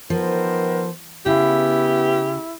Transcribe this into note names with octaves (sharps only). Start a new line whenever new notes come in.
D#3 F3 B3 A#4 C5
C#3 B3 E4 G4